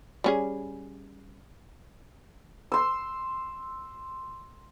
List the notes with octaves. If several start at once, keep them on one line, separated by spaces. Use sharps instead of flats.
G3 C#4 G#4
C6 E6